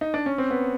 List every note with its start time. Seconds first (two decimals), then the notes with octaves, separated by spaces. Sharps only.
0.01 D#4
0.14 D4
0.26 C#4
0.38 C4
0.51 B3